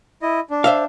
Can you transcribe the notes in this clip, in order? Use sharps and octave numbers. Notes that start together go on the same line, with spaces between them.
E4 D#5
D4
C5 E5 F5